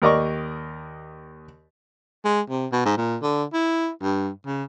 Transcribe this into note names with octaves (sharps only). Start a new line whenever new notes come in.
D#2 A#4 D5 D#5 C#6
G#3
C3
B2
G#2
A#2
D3
E4
G2
C#3